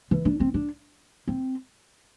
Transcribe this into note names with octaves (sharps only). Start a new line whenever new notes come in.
E3
D4
C4
D4
C4